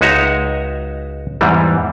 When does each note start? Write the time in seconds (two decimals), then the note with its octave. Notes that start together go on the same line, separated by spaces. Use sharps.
0.01 C#2 G#3 D#4 F#4 E5 A#5
1.41 E2 G#2 E3 G3